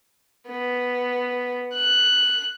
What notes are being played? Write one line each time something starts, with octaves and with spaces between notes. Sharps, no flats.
B3
F#6